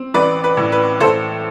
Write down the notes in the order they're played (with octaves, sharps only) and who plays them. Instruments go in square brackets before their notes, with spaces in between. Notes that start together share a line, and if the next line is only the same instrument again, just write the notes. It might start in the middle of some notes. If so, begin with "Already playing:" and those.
Already playing: [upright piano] C4
A1 B4 D5
B4
A2
B4
A2 A4 C5